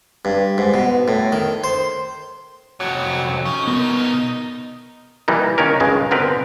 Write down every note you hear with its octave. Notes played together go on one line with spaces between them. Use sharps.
G2
G#2
B2
A2
D#3
C5
C2 F2 F#3
C#4 D#4
B2 B3 A#4
E3 G3 A#3 D#4
D#3 A#3 C#4 A#4
C#2 G2 C#3 G#3
D3 B3 C4 A#4 B4